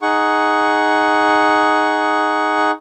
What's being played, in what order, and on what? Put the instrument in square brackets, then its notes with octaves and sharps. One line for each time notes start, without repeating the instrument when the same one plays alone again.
[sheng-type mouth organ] D#4 G#4 F#5 C#6